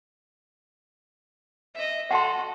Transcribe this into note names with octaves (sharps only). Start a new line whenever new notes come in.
D#5 E5
F#4 A4 F#5 A5 C6